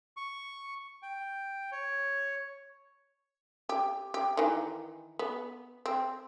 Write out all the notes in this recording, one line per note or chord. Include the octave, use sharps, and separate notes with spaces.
C#6
G5
C#5
G4
G4
D#3 E3
B3
C4